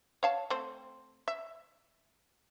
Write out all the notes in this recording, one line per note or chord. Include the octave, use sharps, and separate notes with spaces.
C#5 F5 A5
A3 C4 C5
E5